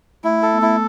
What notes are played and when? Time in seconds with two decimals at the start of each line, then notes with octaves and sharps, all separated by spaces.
0.24 A3 E4
0.42 A3 A4
0.53 B3
0.62 E4